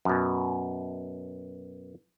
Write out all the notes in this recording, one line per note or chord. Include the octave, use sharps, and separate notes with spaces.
F#2 B2